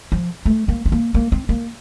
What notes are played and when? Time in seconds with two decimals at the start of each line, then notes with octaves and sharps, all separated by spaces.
0.12 F3
0.45 A3
0.68 A#3
0.86 C4
0.92 A#3
1.14 A#3
1.32 C4
1.49 A#3